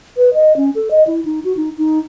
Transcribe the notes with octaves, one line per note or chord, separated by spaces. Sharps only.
B4
D#5
C#4
A4
D#5
E4
D#4
F#4
D#4
D#4